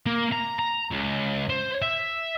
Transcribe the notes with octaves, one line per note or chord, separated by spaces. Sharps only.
A#3
A#5
A#5
C#2
C5
E5